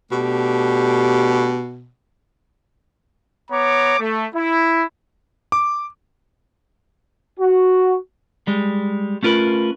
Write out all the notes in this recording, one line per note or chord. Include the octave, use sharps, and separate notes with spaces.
B2 A3 D4 G4
B3 C#5 A#5 D6
A3
E4
D6
F#4
G3 G#3
A3 C#4 F4 A#4 B4